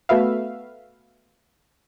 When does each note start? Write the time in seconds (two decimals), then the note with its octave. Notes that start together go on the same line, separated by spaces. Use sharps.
0.09 A3 B3 F#4 B4 E5 F5